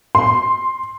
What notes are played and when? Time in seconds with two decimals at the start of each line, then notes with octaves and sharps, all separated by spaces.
0.15 C6